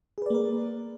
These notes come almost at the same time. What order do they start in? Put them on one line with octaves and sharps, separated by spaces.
G#4 B4 D5 A#3 A#4